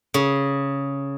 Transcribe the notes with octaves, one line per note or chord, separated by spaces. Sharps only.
C#3